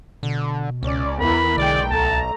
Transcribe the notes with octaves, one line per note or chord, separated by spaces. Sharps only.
B2 D3
C#2 C#4 D5
E2 E3 B3 A#4 B5
B1 D3 G#3 D5 G5
C#2 A3 A5 A#5